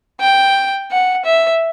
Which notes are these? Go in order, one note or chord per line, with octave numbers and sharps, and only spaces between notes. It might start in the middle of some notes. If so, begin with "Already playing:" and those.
G5
F#5
E5